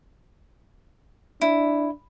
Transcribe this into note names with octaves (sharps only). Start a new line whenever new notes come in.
D4 E4